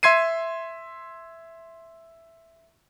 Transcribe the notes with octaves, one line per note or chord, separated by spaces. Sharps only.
E5 C6 G#6 C7 D#7